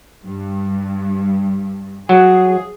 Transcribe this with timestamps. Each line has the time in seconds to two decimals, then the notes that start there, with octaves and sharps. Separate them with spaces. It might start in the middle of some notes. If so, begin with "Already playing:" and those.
0.24 G2
2.09 F#3 G#4